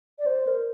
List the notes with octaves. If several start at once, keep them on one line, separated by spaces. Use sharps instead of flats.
D5
C5
A#4